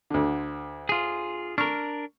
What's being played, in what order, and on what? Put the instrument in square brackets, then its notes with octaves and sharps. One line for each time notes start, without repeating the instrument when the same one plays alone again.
[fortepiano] D2 D3
[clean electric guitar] F4 G#4
[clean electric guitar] D4 A#4 [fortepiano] C#6 F6